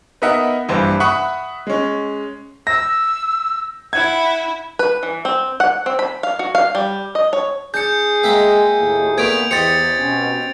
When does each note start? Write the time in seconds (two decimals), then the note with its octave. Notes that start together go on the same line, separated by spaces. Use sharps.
0.22 B3 D#4 A#4 D#5 E5 F#5
0.68 A#1 G2 E3 C5
1.00 E5 F#5 B5 C#6 D#6 F#6
1.67 G#3 C#4
2.67 E6 A#6
3.93 E4 F#5 G#6
4.79 B4
5.03 E3
5.25 C4
5.60 F#5
5.86 C4
5.99 B5
6.23 F5
6.39 F#4
6.55 F5
6.75 G3
7.15 D#5
7.33 C#5
7.74 D4 G#4 G6 C#7
8.23 G#3 A#3 E5 G5
8.79 D#2 A2
9.18 A#2 A3 B3 G#6 D7 F7
9.51 E2 G4 C5 D#5 A6 C#7
9.98 B2 C4 C#4